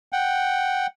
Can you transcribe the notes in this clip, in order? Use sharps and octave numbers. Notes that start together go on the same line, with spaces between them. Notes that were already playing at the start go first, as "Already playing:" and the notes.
F#5 G5